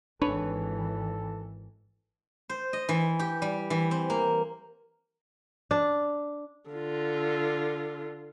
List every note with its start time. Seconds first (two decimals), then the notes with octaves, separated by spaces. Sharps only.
0.22 G#1 E3 D4 A4 B4 C#5
2.49 C5
2.73 D#5
2.89 E3
3.19 G4
3.42 G3
3.70 E3
3.91 C4
4.10 A#3
5.71 D4
6.70 D3 F4